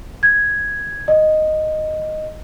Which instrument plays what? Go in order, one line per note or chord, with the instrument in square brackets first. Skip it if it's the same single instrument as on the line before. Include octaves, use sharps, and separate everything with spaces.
[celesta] G#6
D#5